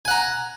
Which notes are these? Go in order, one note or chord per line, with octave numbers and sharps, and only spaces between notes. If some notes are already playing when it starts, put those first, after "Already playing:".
F#5 G#5 A#5